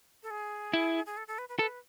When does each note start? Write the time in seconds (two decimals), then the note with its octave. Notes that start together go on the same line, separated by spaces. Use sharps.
0.23 A4
0.31 G#4
0.73 E4
1.06 G#4
1.17 A4
1.28 A4
1.38 B4
1.49 B4
1.59 A4 B4